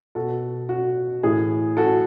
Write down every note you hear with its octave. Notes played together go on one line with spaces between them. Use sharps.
B2 F#4 A4
F#4
A2 E3 G#4
F#4 A4